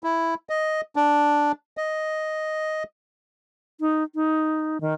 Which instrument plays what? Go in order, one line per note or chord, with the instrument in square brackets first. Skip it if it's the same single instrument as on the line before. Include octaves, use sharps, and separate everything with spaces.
[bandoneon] E4
D#5
D4
D#5
[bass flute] D#4
D#4
D#3